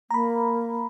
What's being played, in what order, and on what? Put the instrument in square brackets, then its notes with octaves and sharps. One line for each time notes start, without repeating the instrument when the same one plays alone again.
[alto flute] A#3 [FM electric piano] A#5 B5